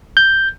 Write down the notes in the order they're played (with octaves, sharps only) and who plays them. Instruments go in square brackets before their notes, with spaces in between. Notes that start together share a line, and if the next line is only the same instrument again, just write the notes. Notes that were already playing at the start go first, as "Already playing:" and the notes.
[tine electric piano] G6